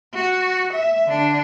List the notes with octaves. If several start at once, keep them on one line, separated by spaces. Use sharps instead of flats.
F#4
E5
D3 D4